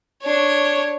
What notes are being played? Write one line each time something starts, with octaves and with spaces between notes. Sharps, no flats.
D4 C#5